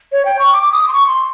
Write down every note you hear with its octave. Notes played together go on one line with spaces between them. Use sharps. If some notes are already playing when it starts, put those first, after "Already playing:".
C#5
G5
C#6
D6
D6
D#6
D6
C6
C#6
C6